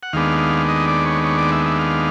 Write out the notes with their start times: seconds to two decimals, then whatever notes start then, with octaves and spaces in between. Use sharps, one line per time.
0.03 F#5
0.13 D#2 D#3 G#3 B3 D4 F5
0.68 D#5
0.88 D5
1.05 C#5
1.24 C#5
1.38 D5
1.52 E5
1.66 E5
1.79 F5